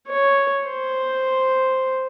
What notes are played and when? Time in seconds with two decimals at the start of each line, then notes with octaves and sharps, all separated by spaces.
0.08 C#5
0.67 C5